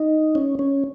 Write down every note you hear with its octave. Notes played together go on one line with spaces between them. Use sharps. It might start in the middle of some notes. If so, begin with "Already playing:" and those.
Already playing: D#4
C#4
C#4